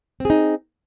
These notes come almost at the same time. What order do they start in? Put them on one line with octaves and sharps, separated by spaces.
C4 G#4 D#4